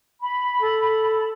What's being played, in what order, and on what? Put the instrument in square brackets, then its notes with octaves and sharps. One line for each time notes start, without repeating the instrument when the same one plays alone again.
[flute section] B5
[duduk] A4